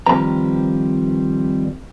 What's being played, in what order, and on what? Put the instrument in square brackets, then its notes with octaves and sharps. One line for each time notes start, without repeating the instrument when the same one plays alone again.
[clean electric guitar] D#3 F3 G3 C4 B4 A#5